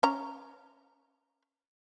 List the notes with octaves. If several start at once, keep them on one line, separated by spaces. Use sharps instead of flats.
C#4 A#5